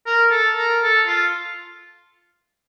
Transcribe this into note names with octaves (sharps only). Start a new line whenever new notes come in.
A#4
A4
A#4
A4
F4